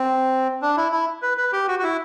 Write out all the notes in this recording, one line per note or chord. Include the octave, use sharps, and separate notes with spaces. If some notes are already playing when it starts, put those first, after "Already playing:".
Already playing: C4
D4
E4
E4
B4
B4
G4
F#4
F#4
E4